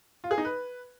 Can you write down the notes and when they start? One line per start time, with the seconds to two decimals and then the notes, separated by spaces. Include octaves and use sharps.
0.24 F4
0.31 G#4
0.38 D#4
0.45 B4